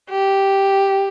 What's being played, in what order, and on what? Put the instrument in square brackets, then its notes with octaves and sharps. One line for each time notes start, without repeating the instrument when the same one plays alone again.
[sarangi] G4